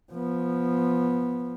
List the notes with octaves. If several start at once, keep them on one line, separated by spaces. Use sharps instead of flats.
F3 B3